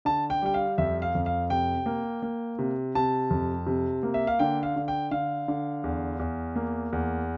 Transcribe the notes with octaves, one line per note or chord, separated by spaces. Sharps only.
D3 A5
G5
G3 G5
F5
F2 E5
F5
F2
F5
C3 G5
A#3
A#3
C3
C3 A5
F2
C3
A#3
E5
F5
D3 G5
F5
D3
G5
D3 F5
D3
E2
E2
A#3
E2